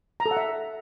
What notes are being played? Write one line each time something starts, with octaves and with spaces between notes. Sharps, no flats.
A#5
A4
F#5
E5